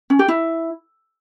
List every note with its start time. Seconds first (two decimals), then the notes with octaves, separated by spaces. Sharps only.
0.10 C#4
0.19 G4
0.28 E4